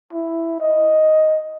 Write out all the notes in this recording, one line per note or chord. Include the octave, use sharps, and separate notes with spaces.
E4
D#5